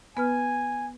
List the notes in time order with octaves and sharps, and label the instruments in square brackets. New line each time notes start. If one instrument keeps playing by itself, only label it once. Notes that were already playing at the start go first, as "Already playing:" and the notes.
[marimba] B3 B4 F6 [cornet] G#5